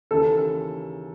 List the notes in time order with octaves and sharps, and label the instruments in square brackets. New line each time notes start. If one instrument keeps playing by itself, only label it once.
[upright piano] D#2 C#3 E3 A4